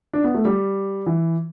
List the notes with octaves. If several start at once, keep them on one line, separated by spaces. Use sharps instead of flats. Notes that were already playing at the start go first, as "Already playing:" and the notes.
D4
B3
A3
G3
E3